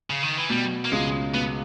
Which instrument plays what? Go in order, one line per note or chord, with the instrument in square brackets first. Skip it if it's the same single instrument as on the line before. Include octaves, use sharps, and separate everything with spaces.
[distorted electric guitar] C#3
D#3
E3
[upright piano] B2 [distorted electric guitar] G3
[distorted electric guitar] A#3
[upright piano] C#2 C#3 [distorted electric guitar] G#3
[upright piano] B2 [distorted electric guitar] B3